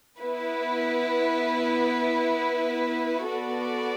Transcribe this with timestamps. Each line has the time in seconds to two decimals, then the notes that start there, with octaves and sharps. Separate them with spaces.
0.20 B3 E4 B4
3.29 B3 F#4 A4 D5